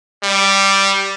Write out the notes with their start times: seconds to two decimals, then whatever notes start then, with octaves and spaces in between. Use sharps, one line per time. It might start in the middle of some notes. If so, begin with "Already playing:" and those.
0.23 G3